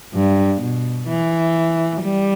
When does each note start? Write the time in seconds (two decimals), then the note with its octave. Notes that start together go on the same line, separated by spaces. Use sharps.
0.14 G2
0.61 B2
1.08 E3
2.02 G3